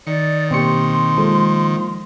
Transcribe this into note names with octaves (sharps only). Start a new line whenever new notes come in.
D#3 D5 C#7
B2 A#3 C4 G4 C6 C#6 C#7
F3 G#3 A#3 A4